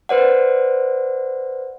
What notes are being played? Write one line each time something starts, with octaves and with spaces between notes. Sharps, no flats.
B4 C5 D5 F#5